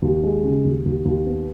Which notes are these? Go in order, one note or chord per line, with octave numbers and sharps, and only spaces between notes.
D#2
G#3
C#3
D#2
D#2
D#2
B3